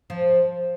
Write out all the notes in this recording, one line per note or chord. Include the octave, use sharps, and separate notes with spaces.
F3